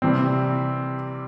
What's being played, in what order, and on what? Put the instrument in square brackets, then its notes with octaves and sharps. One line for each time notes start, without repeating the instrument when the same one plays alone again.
[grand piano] C3 E3 G3 C4